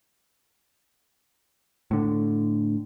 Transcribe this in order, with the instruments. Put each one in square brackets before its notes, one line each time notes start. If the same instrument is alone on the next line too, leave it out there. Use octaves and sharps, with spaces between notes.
[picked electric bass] A2 D3